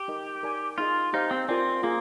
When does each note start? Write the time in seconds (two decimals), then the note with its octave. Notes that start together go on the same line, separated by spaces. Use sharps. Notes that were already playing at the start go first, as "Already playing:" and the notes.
Already playing: G4
0.08 D#4 A#4 D#5
0.43 D#4 A#4 D5 G#5
0.78 D#4 F4 G#4 D#5
1.13 D#4 G4 C5 F5
1.31 C4
1.48 C4 F4 A#4 D5 G#5
1.83 A#3 F4 G#4